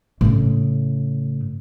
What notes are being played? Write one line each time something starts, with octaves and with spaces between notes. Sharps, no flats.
A2 C#3